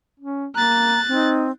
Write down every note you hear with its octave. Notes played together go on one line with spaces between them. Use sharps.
C#4
A#3 A#5 F#6 A6
C4 D#4